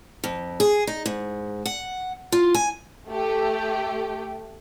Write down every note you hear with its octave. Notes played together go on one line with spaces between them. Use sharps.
F2
G#4
D#4
G#2
F#5
F4
G#5
A3 G4